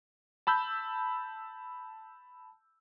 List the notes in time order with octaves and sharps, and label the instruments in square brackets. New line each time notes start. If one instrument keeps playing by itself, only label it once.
[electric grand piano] A5 B5 E6 G6